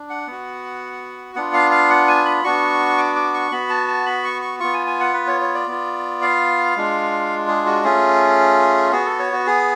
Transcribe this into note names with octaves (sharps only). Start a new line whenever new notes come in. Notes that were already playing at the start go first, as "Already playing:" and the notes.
Already playing: D4
F#5
B3 F#4
B3 D4 F4 F#5
F5
F5
F#5
G#5
B5
B3 D4 F#4 C#6
D6
D6
C#6
B3 F#4 B5
A5
A5
B5
C#6
C#6
B3 F4 C#6
G#5
G#5
F#5
B4
C#5
C#5
D5
B3 F4
F5
G#3 D4 F4
G#4
F#4
A3 C#4 F4 G#4
B3 F#4 G#4
A4
C#5
F#4
G#4